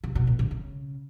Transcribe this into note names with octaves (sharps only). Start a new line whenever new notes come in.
C3
B2
A2
D3
C#3